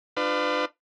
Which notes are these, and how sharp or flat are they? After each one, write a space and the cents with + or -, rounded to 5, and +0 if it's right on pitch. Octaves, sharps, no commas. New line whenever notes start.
D4 +30 F4 +0 B4 +35